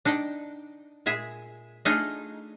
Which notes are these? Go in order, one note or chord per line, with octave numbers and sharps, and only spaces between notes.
D4 D#4 D5 G5
A#2 G#3 G#4 E5
A3 D4 D#4 F4 G#4